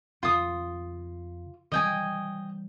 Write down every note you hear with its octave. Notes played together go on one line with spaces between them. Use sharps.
F2 C#3 F4 D#6
D#3 E3 G3 D#5 G5 G#5